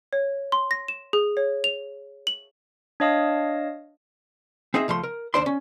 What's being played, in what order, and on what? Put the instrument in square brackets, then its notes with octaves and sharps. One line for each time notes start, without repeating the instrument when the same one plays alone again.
[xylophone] C#5
C6
A#6
E7
G#4
C#5
F7
F#7
[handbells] D4 C#5 D#5 F5 A5 D#6
[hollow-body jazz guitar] C4 D#4 G#4 D#5 E5
C#2 F3 A3 C6
A#4
D#2 D4 C5 D5 C6
C#4